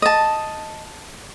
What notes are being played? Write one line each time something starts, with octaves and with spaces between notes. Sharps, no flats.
D#5 A5